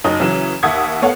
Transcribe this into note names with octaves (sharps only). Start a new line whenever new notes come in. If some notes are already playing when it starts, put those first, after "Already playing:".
F#1 F#3 D#4 C#5 D#6
C#3 E3 F#3 C#4
D#2 E5 F#5 D#6 G#6
B3 A4 C#5 F5 F#5